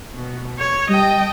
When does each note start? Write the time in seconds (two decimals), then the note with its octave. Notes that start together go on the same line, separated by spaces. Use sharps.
0.13 B2
0.58 C#5
0.89 G3 D#5 G5 A5